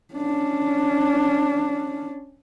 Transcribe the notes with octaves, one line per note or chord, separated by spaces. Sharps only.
C#4 D4